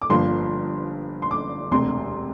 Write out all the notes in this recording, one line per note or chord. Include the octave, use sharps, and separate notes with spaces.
D6
G1 G2 F3 A#3 C6
C6
D6
E1 D2 C3 C6